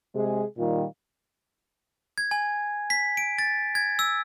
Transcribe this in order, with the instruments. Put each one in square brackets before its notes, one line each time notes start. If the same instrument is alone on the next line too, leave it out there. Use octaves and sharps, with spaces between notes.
[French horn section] C3 G#3 G#4
A#2 D#3 G3 F4
[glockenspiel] G#6
G#5
B6
D7
A6
G#6
E6